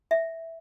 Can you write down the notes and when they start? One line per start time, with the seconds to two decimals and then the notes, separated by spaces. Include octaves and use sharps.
0.11 E5